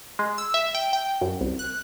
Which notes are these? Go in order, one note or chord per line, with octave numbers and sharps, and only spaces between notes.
G#3
E6
E5
G5
G5
F#2
C2
F#6